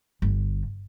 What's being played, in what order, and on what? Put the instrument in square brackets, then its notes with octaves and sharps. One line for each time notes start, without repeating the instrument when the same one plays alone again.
[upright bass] G1